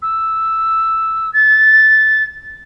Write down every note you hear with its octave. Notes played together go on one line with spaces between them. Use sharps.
E6
A6